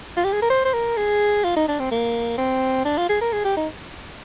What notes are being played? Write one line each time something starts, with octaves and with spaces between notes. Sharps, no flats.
F4
G4
G#4
A#4
C5
C5
A#4
G#4
F4
D#4
D4
C4
A#3
C4
D4
F4
G#4
A#4
G#4
G4
D#4